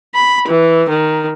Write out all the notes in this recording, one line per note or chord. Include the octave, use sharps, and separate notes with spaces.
B5
E3
D#3